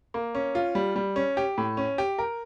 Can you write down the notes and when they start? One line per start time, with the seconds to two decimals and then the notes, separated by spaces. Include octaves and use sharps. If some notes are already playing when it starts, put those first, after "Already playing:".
0.14 A#3
0.35 C#4
0.55 F4
0.75 G3
0.96 G3
1.16 C#4
1.37 G4
1.58 A2
1.77 C#4
1.98 G4
2.18 A#4